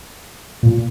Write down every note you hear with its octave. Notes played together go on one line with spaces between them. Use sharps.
A#2